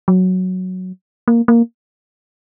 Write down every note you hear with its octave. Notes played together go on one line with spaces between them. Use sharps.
F#3
A#3
A#3